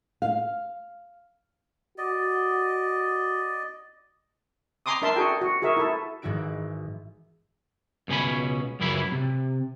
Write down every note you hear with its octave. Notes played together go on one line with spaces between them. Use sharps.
F5
F#4 D5 D#5
G#5 A#5 C6 D6 D#6
D4 A#4 E5 A5 C6
F#4 G#4 A4 G5
F#4
F#4 G#4 A#4 E5
E4 A4
G#1 G#2 E3 E4 F#4 D7
C#2 B2 C#4 G#5 B5
C#2 F#2 E3 F#3 E4 B5
C3